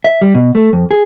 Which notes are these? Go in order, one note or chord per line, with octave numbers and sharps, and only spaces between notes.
E5
G3
B2
A3
F2
G#4